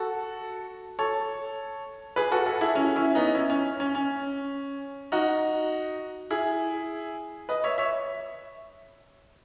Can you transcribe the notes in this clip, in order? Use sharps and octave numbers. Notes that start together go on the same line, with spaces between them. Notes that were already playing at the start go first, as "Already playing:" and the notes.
Already playing: F#4 A4
A4 C#5
G#4 B4
F#4 A4
F#4 A4
E4 G#4
C#4 E4
C#4 E4
B3 D#4
C#4 E4
C#4
C#4
C#4
D#4 F#4
E4 G#4
B4 D#5
C#5 E5
C#5 E5